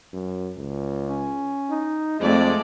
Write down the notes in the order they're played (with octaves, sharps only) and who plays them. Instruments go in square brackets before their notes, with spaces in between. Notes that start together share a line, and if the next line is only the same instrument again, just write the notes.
[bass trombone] F#2
C#2
[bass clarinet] C#4
[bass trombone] D#4
[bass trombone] F2 [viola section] G#3 A3 D5 [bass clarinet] C4